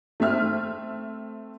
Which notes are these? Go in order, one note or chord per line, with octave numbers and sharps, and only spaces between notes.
A3 C4 E5 F6